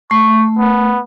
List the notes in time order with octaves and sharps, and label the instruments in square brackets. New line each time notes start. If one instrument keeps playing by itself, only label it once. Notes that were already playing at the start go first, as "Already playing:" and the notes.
[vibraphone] A3 [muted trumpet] C#6
[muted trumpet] B3